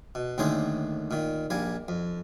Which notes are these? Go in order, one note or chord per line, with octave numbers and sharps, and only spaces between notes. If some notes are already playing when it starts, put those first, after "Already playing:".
B2
D#2 A2 D3 D#3 G#4 C5
A#2 D#3
A#1 G3 A#3 G#5
F2